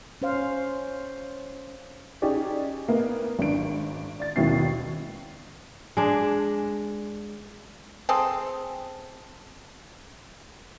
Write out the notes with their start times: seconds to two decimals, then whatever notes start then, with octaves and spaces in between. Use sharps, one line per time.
0.22 C#4 C5 F5
2.22 C#4 D#4 G4 G#4 D5
2.88 A#3 B3
3.39 G#1 D4 D7
4.20 D5 A6
4.36 G#1 D#2 B2 C#4 E4 C7
5.97 G#3 D4
8.09 C4 G#4 A4